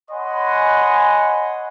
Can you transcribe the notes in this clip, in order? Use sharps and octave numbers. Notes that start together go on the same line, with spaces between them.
C#5 D#5 F#5 G#5 B5 C6